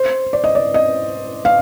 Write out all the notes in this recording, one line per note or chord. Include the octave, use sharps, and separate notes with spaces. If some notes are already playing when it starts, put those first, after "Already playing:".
Already playing: C5
D5
D#5
D5
D#5
F5